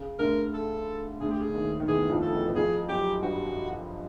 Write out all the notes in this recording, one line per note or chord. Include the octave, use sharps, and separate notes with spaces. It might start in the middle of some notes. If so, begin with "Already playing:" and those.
Already playing: C#3
D2 D3 A#4
A4
D2 D3 G#4
G4
G#4
D3
D#2 D#3
D#3
E2 E3 G#4
F2 F3
A4
E2 E3
E3
F2 F3 G#4
F#2 F#3 G4
G2 G3 F#4